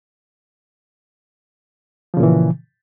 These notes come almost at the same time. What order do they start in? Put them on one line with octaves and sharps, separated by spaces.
F3 C#3 A#2 E3